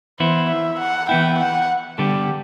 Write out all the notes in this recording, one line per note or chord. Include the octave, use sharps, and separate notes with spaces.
E3 B3 E4 C5
E5
F#5
E3 B3 E4 G5
F#5
D3 G3 B3 D4 G4 A4